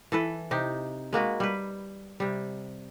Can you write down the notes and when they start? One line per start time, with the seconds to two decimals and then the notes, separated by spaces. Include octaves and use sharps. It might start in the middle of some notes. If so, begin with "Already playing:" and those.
0.12 E3 A4 B4
0.51 C3 D#4 G4
1.13 G#3 A#3 F#4 B4
1.40 G3 B4
2.20 C3 G3